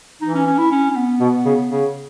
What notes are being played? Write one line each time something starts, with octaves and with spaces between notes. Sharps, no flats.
E3 D#4
C#4
C#4
E4
C#4
C#4
B3
B2
C#3
C#3